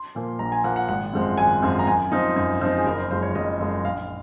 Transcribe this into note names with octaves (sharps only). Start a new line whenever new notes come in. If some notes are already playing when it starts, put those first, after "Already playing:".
Already playing: C6
A#2 F3 A#3
A#1 A#5
G#5
A#2 F3 A#3 F#5
F#5
G#1 F#5
F#2 F3 G#3 C4
G#1 G#5
F#2 F3 G#3 C4
A#5
F#2 G#5
F3 C4 D#4
F#2
F3 C4 D#4
G#4
F#1 A#4
C5
F#2 F3 G#3 C5
C#5
F#1 D#5
F#2 F3 G#3
A#1 F5